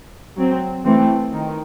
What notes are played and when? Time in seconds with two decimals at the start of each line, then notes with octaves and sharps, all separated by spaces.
0.37 F#3 C4
0.85 E3 A3 C4
1.33 D#3